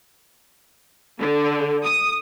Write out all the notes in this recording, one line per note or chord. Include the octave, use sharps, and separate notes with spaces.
D3
D#6